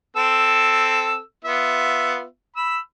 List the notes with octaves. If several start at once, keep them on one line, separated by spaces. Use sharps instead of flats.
C4 A4 E6
B3 F4 E5
B5 E6